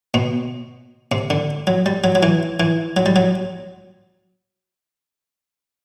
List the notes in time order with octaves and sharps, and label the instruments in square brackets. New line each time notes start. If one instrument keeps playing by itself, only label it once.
[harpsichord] B2
C3
D3
F#3
G3
F#3
F#3
E3
E3
F#3
G3
F#3